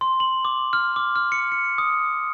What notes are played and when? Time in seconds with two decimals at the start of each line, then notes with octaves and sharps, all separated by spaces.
0.01 C6
0.20 F#7
0.45 D6
0.73 F6
0.96 D6
1.16 F6
1.32 C#7
1.52 C#7
1.78 D#6